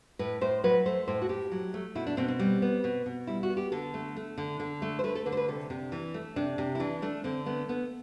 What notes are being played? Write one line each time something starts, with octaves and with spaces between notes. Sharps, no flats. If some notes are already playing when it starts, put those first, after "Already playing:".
A2 B4
A2 C5
F#3 B4
A3 C5
A2 C5
F#4
A2 G4
F#3
A3
B2 E4
D4
B2 C4
C4
G3
B3
B2
B2
G3 E4
F#4
B3
G4
D3 A4
A3
A3
D3
D3
A3
C5
A3 B4
A4
D3 B4
C5
B4
C3 A4
C3 D4
E3
A3
C3 D4
C3
E4
E3 D4
A3 D4
D3 C4
A3 B3
A3 B3